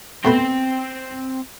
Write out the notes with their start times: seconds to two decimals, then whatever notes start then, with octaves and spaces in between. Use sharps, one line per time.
0.25 B2 A3 C4 B4 G5